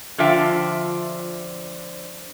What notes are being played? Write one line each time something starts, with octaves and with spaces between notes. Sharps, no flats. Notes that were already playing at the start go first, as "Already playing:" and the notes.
D3 F3 F4 E5 G5